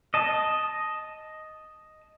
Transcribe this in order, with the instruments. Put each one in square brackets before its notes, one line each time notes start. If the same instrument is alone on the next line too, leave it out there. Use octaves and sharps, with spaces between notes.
[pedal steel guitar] D#5 A5